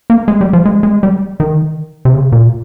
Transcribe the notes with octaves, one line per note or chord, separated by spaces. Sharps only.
A#3
G#3
G3
F3
G#3
G#3
G3
D#3
C3
C#3
A#2